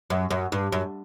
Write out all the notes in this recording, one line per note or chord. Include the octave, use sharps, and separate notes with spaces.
F#2
F#2
G2
F#2